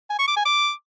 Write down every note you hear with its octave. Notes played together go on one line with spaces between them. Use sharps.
G#5
C#6
D6
G#5
D6